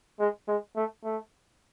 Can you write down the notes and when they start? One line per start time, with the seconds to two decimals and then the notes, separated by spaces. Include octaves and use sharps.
0.19 G#3
0.48 G#3
0.76 A3
1.04 A3